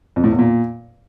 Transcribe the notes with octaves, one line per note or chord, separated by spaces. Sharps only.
F2
A2
E2
A#2